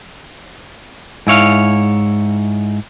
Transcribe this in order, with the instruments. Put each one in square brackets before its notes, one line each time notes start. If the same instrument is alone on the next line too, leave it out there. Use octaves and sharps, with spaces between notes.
[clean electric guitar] G#2 E4 C#5 F5